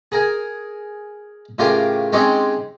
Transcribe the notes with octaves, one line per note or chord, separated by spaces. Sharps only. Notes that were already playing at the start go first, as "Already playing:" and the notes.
G#4 A#4 G#5
A2 C#3 F4 G4 A#4 G#5
G#3 C4 C#4 D#4 G4 G#4